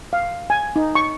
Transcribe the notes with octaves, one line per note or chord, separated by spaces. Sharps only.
F5
G#5
D#4
C#6